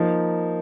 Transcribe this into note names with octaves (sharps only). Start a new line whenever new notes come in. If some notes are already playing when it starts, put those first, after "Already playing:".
Already playing: F3 A#3 D#4